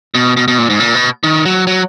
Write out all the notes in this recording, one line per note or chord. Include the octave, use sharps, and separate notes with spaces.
B2
B2
B2
A#2
G#2
A#2
B2
D#3
F#3
F#3